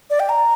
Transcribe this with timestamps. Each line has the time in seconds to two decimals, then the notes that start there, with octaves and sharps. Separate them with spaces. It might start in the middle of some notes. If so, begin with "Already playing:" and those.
0.10 D5
0.20 G5
0.29 A#5